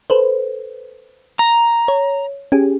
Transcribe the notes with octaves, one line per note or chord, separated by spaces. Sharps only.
A4 B4 C5
A#5
C#5
C#4 G4 G#4